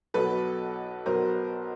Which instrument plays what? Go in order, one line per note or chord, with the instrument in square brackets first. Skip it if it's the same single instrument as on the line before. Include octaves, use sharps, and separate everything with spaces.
[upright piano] B1 B2 A4 B4
B1 B2 A#4 C5